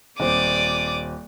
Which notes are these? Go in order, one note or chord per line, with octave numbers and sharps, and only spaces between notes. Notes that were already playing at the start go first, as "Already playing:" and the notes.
D#1 C4 D5 D6 D#6